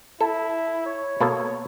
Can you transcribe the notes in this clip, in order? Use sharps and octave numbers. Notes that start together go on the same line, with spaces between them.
E4 A4
C#5
B2 A#3 A4